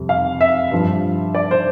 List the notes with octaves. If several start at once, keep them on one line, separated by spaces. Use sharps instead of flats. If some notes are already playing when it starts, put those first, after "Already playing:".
Already playing: F2 C3 G3
F5
E5
G2 F3
D5
C5